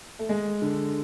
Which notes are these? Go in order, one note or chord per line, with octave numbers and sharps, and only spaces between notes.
A3
G#3
D3